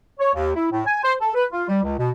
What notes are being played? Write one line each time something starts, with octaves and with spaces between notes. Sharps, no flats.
C#5
D#2
E4
A2
G#5
C5
A4
B4
F4
G3
C#2
B2